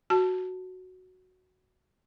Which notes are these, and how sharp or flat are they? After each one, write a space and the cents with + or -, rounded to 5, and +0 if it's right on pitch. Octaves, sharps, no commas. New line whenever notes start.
F#4 +0 A5 +0